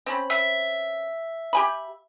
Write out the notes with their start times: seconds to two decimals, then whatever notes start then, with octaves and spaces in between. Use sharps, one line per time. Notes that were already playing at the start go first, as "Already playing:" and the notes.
0.06 C4 C#4 B5
0.30 E5
1.53 G4 G#5 B5